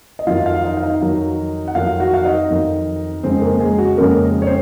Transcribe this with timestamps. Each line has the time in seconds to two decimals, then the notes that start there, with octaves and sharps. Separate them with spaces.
0.19 D#5
0.27 F2 D#3 F#3 F4 F5
0.46 F4 F5
0.64 D#4 D#5
0.77 F5
0.83 D#4 D#5
1.01 F2 D#3 F#3
1.68 F#5
1.75 F2 D#3 F#3 F4 F5
2.00 F#4 F#5
2.14 F5
2.25 D#4 D#5
2.50 F2 D#3 F#3
3.23 F2 C#3 G#3 C4 C#4 C5
3.41 A#3 A#4
3.60 G#3 G#4
3.78 F#4
3.97 F2 C#3 G#3 A#3 C#4 A#4
4.42 C#5
4.46 C4 C5